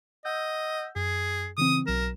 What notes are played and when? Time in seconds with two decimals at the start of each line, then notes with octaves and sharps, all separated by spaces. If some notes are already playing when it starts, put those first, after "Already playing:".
0.25 D#5 F#5 E6 G6
0.96 F#2 G#4
1.58 C#3 E3 C4 D#6
1.87 B1 F#3 A#4 E7